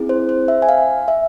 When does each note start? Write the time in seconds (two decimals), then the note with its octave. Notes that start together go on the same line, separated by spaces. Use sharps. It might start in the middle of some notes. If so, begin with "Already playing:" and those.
Already playing: C4 E4 G#4
0.09 C5
0.29 C5
0.48 E5
0.62 G#5
0.69 F5
1.08 E5